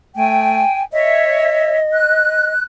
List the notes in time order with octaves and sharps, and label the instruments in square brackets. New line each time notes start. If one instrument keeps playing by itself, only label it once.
[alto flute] A3 [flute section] G5 G#5
[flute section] C#5 E5 [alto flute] D#5
[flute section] F#6